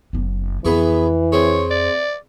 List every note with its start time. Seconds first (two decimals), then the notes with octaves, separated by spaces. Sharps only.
0.13 F#1 B3
0.65 F2 E3 B3 E4 G#4 C#6
1.32 C4 G#4 C#5
1.70 D5